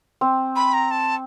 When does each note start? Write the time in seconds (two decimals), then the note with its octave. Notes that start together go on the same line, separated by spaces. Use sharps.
0.21 C4
0.56 B5
0.74 A#5
0.91 A5